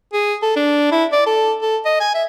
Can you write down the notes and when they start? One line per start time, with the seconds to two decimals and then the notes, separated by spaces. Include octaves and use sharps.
0.13 G#4
0.43 A4
0.56 D4
0.92 E4
1.13 D5
1.27 A4
1.62 A4
1.86 D#5
2.01 G#5
2.15 E5